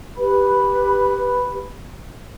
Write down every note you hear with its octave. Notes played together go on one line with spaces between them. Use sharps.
G4 B4 B5